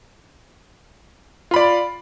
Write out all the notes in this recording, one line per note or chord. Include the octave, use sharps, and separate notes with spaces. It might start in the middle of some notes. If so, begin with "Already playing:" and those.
F4 D5 B5